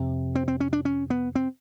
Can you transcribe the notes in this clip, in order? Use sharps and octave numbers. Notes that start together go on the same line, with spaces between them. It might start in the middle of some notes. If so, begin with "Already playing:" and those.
Already playing: F2 C3
C4
C4
C#4
D4
C#4
B3
C4